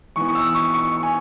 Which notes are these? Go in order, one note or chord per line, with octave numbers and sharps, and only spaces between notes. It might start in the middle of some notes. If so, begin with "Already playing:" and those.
E3 B3 C#6
C#6
E6
C#6
C#6
G#5